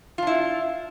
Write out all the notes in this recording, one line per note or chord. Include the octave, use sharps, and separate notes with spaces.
D4 E4 F4